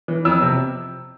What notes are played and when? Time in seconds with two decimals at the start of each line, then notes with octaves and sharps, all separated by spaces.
0.08 E3
0.25 F2 E6
0.42 C3